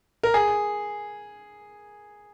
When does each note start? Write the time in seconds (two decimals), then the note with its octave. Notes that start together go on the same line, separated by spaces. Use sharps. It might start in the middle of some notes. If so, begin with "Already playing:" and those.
0.23 A#4
0.34 G#4